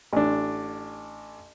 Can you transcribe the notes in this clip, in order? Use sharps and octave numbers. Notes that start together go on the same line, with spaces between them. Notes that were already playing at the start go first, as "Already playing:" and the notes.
A1 D4